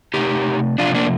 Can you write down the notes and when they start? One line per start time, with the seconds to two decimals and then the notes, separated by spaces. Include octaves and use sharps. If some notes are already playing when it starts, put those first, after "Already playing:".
0.14 C3 F3 A3 D#4 G4
0.78 C3 F3 A3 D4 F4
0.95 A#3 D4